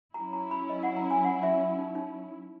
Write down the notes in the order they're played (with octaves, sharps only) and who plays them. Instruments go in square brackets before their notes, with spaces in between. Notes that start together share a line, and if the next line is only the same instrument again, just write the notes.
[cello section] F#3 C#4 E4 [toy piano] A#5
[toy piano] A#5
B5
D#5
F#5
A#5
G#5
F#5
E5
D#4
D#4